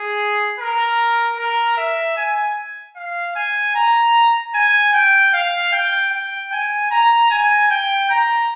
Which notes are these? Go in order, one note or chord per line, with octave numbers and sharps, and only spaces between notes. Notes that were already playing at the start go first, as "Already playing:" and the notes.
Already playing: G#4
A#4
A#4
E5
G#5
F5
G#5
A#5
G#5
G5
F5
G5
G5
G#5
A#5
G#5
G5
A#5